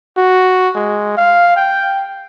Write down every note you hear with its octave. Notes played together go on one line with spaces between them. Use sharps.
F#4
G#3
F5
G5